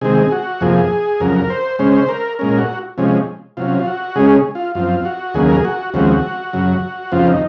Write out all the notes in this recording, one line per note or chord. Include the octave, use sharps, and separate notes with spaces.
C3 D#3 G#3 C4 G#4
F#4
F2 C3 F3 A#3 G#4
F2 C#3 F#3 A#4
C5
C#3 G#3 C#4 C5
A#4
A#2 G#3 C#4 A#4
F#4
C3 F3 G#3 C#4
C3 F#3 C#4 F4
F4
F#4
C#3 G#3 C#4 G#4
F4
F#2 F3 C4 F4
F#4
D#2 C#3 F#3 A#3 G#4
A#4
G#4
F#4
D#2 C#3 F3 G#3 C4 F#4
F#2 C#3 F#3
F2 C#3 F3 C4 F4
D#4